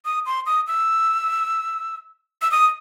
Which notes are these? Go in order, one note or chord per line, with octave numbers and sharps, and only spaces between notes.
D#6
C6
D#6
E6
E6
D#6